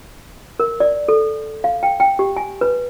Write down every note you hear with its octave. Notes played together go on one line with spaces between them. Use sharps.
A#4
D5
A4
F5
G5
G5
G4
G#5
B4